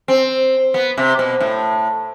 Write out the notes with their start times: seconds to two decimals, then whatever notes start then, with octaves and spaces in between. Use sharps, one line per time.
0.08 C4
0.74 B3
0.98 C3
1.19 B2
1.40 A2